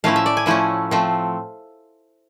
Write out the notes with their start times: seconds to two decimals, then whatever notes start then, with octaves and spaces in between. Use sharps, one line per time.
0.04 A2 F3 A3 C#4 E4 F5
0.16 E5
0.26 D5
0.37 G#5
0.46 A2 F3 A3 C#4 E4
0.91 F3 A3 C4